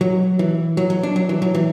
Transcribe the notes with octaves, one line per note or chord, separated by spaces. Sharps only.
F#3
E3
F#3
F#3
D4
F#3
E3
F#3
E3